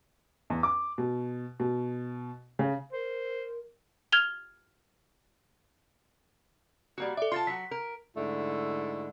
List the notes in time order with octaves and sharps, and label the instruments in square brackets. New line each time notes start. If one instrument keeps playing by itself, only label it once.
[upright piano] E2
D6
B2
B2
C#3
[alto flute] A#4 [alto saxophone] C5
[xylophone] F6 G#6 F7 G7
[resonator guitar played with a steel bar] G3 A#3 F#4
[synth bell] A4 E5 [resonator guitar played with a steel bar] D5
[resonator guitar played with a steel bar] F4 A5 [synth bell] C6
[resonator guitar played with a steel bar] F#3 F#4 [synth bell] B6
[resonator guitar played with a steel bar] A#4
[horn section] G#2 D3 A3 E4